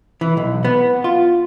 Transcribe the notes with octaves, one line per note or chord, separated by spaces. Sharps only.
E3
B1
B3
F4